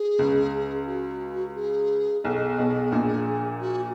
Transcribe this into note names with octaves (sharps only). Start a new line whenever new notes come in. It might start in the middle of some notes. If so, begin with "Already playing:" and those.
Already playing: G#4
C#2 C#3
F#4
G#4
B1 B2 G#4
B1 B2
A#1 A#2
F#4